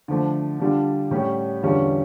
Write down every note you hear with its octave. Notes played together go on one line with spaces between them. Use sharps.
D3 F3 A3
D3 G3 D4 F4
A2 G3 C#4 G4
E2 D3 G3 C#4 F4